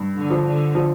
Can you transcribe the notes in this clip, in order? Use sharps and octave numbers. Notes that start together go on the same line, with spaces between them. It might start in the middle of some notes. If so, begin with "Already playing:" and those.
Already playing: G2
D3
F3
D3
F3